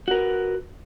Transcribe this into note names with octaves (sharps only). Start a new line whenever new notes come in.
F#4 A#4 B4